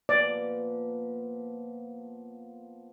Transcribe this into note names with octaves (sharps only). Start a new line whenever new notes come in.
A#2 F3 B3 D5